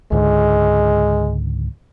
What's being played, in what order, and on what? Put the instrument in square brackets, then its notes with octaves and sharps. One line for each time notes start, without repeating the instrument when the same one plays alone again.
[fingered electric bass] C#2 G#2 D3 [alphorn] G#3